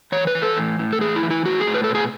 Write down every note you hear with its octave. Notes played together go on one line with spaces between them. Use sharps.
E3 C#5
B4
E3
A4
A2
A2
A4
E3 G#4
E4
E3
E4
A2 F#4
G#4
A2
B4
A4
B2
G#4